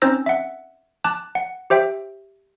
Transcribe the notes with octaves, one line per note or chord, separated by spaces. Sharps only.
C4 C#4 D#4 C5 E6 A#6
E5 F#5
A5 D6 F#6
F#5
G4 C5 E5 G5